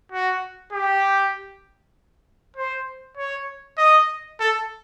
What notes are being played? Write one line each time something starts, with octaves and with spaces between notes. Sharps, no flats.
F#4
G4
C5
C#5
D#5
A4